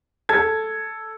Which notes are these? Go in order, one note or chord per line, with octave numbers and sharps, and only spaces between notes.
A4 G#6